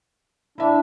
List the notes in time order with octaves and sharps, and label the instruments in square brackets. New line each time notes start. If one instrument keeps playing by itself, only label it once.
[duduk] D4 [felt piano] E4 E5